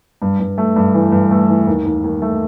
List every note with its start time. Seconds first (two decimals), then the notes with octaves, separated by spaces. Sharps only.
0.22 G2
0.40 G2
0.58 A3
0.76 G2
0.94 E3
1.12 G2
1.31 A3
1.49 E3
1.67 D#2
1.85 D#2
2.04 D#2
2.22 A3